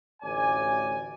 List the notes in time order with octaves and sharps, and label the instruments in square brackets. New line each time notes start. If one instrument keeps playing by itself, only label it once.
[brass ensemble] A1 D2 D5 G#5